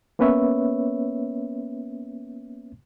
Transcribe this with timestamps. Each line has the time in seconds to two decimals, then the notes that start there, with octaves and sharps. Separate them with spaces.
0.19 A#3 B3 C#4 B4 C#5 E5